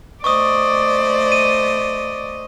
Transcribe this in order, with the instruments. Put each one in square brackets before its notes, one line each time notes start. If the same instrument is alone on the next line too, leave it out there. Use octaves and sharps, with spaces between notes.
[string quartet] A3 C5 D#5 [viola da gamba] D5 [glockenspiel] C#6 D#6
[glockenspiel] D#7